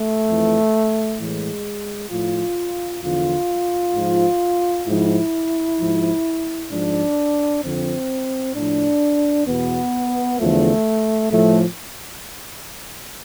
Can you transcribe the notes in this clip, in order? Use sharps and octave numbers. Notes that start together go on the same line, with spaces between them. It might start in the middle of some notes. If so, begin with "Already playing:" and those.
Already playing: A3
F2 E3
A2 E3 G#3
A2 F3 F4
E2 D3 F3 F4
G#2 F3
G#2 F3 E4
G#2 F3
G#2 F3 D4
F2 D3 F3 C4
A2 F3 D4
E2 B2 B3
E2 D3 F3 A3
A2 F3 A3